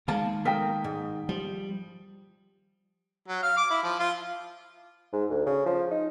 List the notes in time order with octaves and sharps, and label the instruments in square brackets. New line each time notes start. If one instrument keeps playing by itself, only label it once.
[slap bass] D#3 G#3 [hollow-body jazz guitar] A#3 F5 A5
[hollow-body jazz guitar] A3 A#3 A#4 [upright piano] G5 D#6 B6
[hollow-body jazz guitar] G#2
[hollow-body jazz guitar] F3 [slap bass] G3
[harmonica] F#3
F5
D6
E4
F3
F4
[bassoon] G#2
D2
C#3
F3
D#4